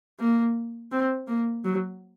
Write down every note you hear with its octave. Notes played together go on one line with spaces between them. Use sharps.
A#3
C4
A#3
F#3